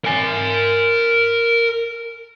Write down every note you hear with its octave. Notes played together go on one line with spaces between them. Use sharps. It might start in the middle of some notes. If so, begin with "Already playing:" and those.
A#4 G#5